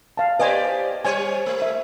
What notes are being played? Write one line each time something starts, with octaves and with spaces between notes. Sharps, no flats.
F5 A5
G4 B4 C5 D5 D#5 G#5
G3 C5 C#5 G#5
A3
E5